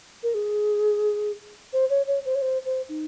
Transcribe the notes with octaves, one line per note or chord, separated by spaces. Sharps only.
A#4
G#4
C5
C#5
C#5
C5
C#5
C5
C5
D#4